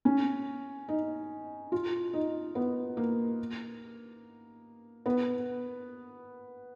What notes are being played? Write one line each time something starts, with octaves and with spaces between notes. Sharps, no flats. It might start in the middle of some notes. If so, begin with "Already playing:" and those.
C#4
D#4
F4
D#4
B3
A#3
B3